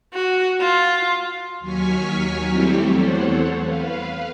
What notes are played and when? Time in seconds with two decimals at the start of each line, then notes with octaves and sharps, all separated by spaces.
0.14 F#4
0.61 F4
1.60 D#2 F#3 G#5 C#6 F6 B6
2.47 F#3 G3 A3 C4 E4 G4
2.90 E2 A4 C5 C#5 F#5
3.61 B4 F5